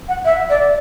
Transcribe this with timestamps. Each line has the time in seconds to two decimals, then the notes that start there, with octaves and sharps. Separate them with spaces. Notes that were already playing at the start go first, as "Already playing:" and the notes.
0.08 F#5
0.25 E5
0.49 D5